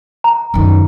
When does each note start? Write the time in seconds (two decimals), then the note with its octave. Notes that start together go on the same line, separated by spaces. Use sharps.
0.24 A#5
0.54 F#2 D#3